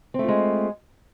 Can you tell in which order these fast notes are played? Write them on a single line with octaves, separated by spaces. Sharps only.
C4 A3 F4 G#3